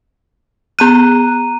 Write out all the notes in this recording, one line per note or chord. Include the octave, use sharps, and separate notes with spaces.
B3 A#5 F#6 D#7